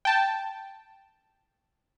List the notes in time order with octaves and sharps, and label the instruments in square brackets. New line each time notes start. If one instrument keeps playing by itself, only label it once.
[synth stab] G5 A5